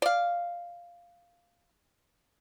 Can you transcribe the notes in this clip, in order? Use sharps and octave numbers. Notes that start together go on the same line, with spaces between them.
D5 F5